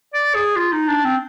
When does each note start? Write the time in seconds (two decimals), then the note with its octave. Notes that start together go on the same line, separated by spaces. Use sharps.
0.14 D5
0.35 G#4
0.56 F4
0.72 D#4
0.89 D4
1.04 C4